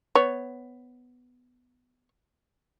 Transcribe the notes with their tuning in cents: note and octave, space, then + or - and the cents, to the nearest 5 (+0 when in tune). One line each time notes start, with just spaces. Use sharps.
B3 +10 C#5 +0